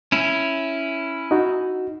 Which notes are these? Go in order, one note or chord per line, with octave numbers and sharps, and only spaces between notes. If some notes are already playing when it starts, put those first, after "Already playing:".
C#4 E4
D#4 F#4